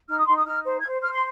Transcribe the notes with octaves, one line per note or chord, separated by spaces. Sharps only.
D#4 F6
D#6
D#4 C6
D#6
D#4 F6
C5
G#6
C5 F6
C5 F6
C6